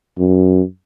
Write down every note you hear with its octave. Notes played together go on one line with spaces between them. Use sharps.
F#2